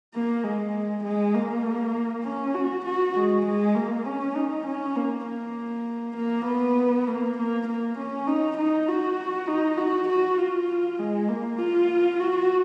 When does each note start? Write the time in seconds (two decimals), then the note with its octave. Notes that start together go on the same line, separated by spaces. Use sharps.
0.14 A#3
0.44 G#3
1.04 G#3
1.35 A#3
2.25 C#4
2.55 F#4
2.85 F#4
3.16 G#3
3.46 G#3
3.75 A#3
4.05 C#4
4.36 D#4
4.67 C#4
4.96 A#3
5.27 A#3
6.17 A#3
6.46 B3
7.07 A#3
7.38 A#3
7.68 A#3
7.98 C#4
8.27 D#4
8.57 D#4
8.88 F#4
9.47 D#4
9.77 F#4
10.08 F#4
10.38 F4
10.99 G#3
11.29 A#3
11.59 F4
12.20 F#4